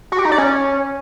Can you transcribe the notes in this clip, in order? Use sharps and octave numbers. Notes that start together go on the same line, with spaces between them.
F#4
G4
D#4
D5
C#4